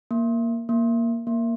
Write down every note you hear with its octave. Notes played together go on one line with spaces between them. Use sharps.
A#3
A#3
A#3